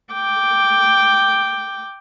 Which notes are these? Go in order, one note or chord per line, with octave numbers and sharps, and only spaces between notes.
G5 D6